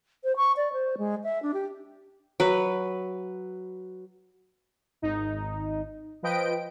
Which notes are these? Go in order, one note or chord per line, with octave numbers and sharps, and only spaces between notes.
C5
C#6
D5
C5
G#3
E5
D4
G4
F#3 B4
G#1 D#4
F3 B4 D#5 G5 D7